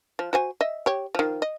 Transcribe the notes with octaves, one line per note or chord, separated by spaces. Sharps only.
F3
F#4 C5 G#5
D#5 E5
G4 C#5
D#3 F3
D#5